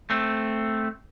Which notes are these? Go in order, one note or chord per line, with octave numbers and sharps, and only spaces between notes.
A3 C4